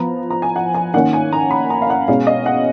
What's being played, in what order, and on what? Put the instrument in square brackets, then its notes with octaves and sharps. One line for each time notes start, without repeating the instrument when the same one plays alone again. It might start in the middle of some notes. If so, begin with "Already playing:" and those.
Already playing: [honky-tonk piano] F3 B3 A#5
A#5
G#5
F#5
G#5
D#3 A#3 C#4 F#5
G#5
A#5
B5
A#5
F5
F#5
B2 G#3 C#4 F5
D#5
F#5